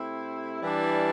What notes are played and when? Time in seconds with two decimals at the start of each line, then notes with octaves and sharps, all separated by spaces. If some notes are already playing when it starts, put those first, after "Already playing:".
Already playing: C3 A3 C4 E4
0.62 E3 G3 D4